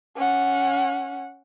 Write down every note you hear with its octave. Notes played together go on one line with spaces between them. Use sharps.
C#4 F#5